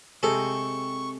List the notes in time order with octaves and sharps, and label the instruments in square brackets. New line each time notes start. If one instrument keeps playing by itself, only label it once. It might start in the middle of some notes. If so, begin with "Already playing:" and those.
[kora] C3 G#3 C4 [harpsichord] A4 [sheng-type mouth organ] C#6